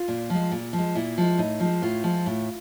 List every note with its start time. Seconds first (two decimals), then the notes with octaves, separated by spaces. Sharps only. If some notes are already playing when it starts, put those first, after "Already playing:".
Already playing: F4
0.08 A#2
0.30 F3 G#3
0.52 A#2
0.73 F3
0.78 G#3
0.95 A#2 E4
1.18 F3 G#3
1.38 A2 D#4
1.60 F3 G#3
1.82 A2 F4
2.04 F3 G#3
2.26 A2